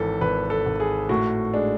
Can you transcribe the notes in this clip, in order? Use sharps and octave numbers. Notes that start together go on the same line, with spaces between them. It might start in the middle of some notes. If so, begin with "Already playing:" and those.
Already playing: G#1 E3 A4
G#1 B4
A4
G#1
G#4
A2 F#4
G#3 D4